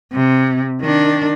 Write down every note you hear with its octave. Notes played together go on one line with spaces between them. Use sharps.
C3
D#3 D4